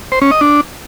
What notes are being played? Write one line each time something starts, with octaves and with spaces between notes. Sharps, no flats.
C5
C#4
D#5
D4